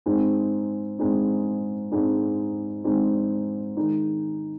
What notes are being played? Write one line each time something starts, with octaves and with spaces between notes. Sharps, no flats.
G#2 G#3 C4 D#4
G#2 G#3 C4 D#4
G#2 G#3 C4 D#4
G#2 G#3 C4 D#4
D#3 G#3 D#4